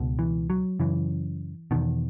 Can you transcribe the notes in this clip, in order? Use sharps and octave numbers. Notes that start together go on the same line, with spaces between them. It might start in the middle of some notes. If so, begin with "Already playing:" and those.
Already playing: C#2 B2
E3
F#3
F#2 C#3 E3
E2 B2 D#3